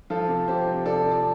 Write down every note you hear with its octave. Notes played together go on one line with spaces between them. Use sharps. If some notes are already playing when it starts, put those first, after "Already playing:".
F3 F4 A4
C3
C3 G4 C5
C3
C3 A4 D5
F3
D5